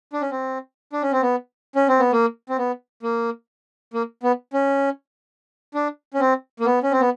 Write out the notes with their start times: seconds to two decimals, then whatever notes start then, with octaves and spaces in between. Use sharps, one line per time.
0.13 D4
0.22 C#4
0.31 C4
0.93 D4
1.02 C#4
1.12 C4
1.22 B3
1.75 C#4
1.89 C4
1.99 B3
2.12 A#3
2.49 C4
2.58 B3
3.03 A#3
3.93 A#3
4.23 B3
4.53 C#4
5.74 D4
6.14 C#4
6.20 C4
6.60 A#3
6.66 B3
6.83 C#4
6.91 C4
7.00 B3